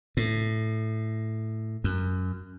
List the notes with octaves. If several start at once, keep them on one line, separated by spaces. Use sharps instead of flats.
A2
F#2